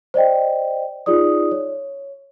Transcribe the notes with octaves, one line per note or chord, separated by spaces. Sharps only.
C5 D5 D#5 G5
D#4 F4 G#4 D5 D#6
C#5